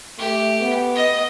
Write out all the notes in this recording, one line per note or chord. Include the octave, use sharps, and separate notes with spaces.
A3 G4
B3
D#5